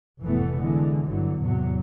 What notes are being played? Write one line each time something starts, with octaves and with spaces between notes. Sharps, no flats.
F1 A2 E3 A3 B3
D3 E3 G#3
G1 D3 E3 F#3
E2 A2 C3 F#3